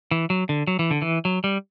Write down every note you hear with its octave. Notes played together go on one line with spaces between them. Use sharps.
E3
F#3
D3
F#3
E3
D3
E3
F#3
G3